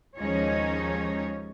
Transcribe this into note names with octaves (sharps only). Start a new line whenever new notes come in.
D#2 F3 G#3 C#4 D#4 C#5